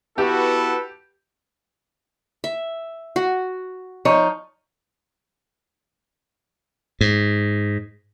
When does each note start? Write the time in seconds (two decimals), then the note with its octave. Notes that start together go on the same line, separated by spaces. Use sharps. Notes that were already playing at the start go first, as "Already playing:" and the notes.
0.18 B3 E4 F#4 G4 A4 B4
2.44 E5
3.16 F#4
4.05 F3 D#4 C#5
7.01 G#2